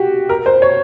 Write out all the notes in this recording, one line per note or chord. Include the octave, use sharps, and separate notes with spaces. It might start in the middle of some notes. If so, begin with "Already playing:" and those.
Already playing: F#4 G4
A#4
C5
C#5